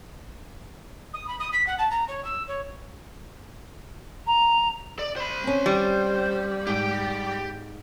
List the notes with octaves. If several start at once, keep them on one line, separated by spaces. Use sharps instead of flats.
D#6
B5
D#6
B6
F#5
A5
A#5
C#5
E6
C#5
A#5
D5
C5 B5
C4 C#4
G3
G#2 G4 G5